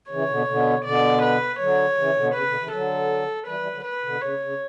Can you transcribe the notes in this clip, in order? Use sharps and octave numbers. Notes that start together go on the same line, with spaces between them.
C#3 E3 C#5
B2 D3
B2 D3
B2 D3 D5
B4
D3 F#3 C#5
C#3 E3
B2 D3
C#3 B4
B2 D3
C#3 E3
D3 F#3 A4
E3 G3 B4
E3 G3
D3 F#3
B4
B2 D3
C#3 C#5
C#3